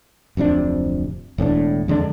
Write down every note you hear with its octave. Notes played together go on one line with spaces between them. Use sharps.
D1 F2 C3 D4
E1 A2 C4 D4
F2 D3 G#3 D4